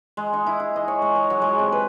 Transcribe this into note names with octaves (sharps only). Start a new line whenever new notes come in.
G#3
D#4
E4
G#4
D#5
C#5
G#3
A#5
F#3
G#3
C3
B4